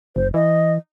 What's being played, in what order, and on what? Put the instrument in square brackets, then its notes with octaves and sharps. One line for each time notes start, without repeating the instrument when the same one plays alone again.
[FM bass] F#1 [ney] C5
[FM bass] E3 [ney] D#5